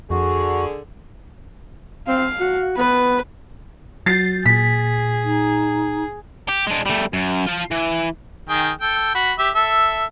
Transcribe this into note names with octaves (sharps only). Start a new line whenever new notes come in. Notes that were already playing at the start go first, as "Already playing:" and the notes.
F2 D3 F#4 G#4
C4 F5
F#4
B3 B4
F#3 F#4 G6 A6 C7
A#2 G#4 B6
D#4
G4
G#3 D4
G3 A3
F#2
F4 A5
E3
D#3 G#4 G5
A4 G5
F#4 B5
G4 E5
A4 E5